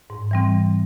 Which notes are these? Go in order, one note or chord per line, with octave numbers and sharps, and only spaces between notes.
G#2
E3 G3 C4